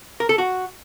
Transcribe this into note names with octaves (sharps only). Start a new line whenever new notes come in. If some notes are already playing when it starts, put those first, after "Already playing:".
A#4
A4
F#4